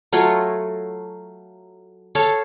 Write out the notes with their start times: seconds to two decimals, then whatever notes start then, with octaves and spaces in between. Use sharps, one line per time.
0.13 F#3 A3 F4 C#5
2.15 A4 C#5 F5 A5